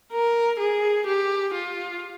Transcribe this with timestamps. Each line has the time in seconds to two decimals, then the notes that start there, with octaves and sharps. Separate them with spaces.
0.13 A#4
0.60 G#4
1.07 G4
1.54 F4